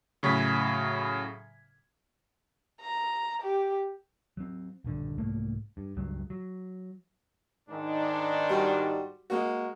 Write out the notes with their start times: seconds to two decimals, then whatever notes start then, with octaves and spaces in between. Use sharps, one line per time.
0.23 A2 C#3 F#3 G#6 B6
2.81 A#5
3.42 G4
4.37 F#3 C4
4.84 A#1 G2 D3
5.18 C2 G#2 A3 A#3
5.77 G2
5.96 C#2 G2 F#3 G#3
6.30 F#3
7.69 G#2 D#3 D4
8.49 G3 F#4 C5
9.30 G#3 A#3 F#4